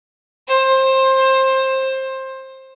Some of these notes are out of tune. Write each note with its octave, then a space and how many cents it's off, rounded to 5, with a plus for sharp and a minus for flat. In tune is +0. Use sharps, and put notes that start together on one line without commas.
C5 +20